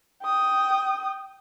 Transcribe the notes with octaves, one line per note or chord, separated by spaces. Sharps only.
G5 D#6